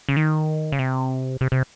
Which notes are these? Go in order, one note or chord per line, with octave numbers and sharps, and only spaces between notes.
C#3
D#3
C#3
C3
C3
C3